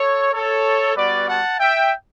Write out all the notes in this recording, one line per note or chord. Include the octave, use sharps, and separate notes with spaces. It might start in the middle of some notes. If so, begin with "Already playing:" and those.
Already playing: A4 C#5
A4 C#5
G3 B3 F#4 B4 D5
F#5 A5
E5 G5